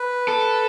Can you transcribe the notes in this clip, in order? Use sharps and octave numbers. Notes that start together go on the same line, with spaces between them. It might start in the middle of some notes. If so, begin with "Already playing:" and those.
Already playing: B4
A4